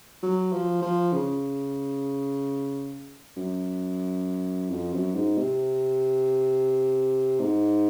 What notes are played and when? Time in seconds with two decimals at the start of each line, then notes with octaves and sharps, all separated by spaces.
0.23 F#3
0.52 F3
0.82 F3
1.12 C#3
3.36 F#2
4.71 F2
4.93 F#2
5.15 G#2
5.38 C3
7.40 G#2